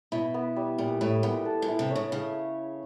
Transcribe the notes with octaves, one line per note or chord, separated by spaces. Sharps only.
B2 E4
B3
G3
A#2 G3
A2 E4
A#2 B3
A4
A#2
E4
C3
C#5
C#3
C#3